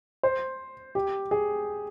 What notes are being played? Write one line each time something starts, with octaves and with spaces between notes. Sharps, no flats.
C5
G4
G#4